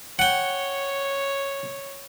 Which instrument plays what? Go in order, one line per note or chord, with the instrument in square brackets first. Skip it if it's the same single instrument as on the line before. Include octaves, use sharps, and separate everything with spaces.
[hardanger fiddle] C#5 [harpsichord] F#5 G5